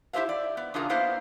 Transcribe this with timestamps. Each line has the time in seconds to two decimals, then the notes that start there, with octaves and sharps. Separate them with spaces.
0.13 E4 G4 G#4 C5 E5 F5
0.29 D5
0.57 B3
0.74 C#3 D4 F4 G#4 A#4
0.89 A#3 B3 E4 C5 F5